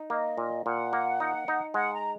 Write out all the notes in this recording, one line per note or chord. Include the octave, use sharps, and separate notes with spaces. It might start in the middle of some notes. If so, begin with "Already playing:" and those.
Already playing: D#4
A#3 D#5
A#2
A#2 F#5
A#3
D#4
D#4
G#3 F#5
A#5